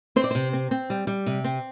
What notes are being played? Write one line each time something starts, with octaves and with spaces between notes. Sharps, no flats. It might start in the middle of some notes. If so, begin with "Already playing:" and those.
C4 C5
D5
C3 C5
C4
C4
G3
G3
C3
C4